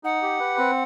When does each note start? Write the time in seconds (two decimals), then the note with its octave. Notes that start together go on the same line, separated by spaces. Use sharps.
0.04 D#4 F#5
0.22 G4
0.40 B4
0.58 C4